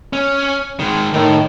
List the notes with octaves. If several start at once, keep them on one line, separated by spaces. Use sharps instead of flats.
C#4
D#3 G#3
A2 D#3